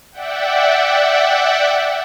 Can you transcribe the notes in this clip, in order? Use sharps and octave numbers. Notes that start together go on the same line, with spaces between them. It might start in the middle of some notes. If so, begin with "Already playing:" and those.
D5 E5 F#5 G5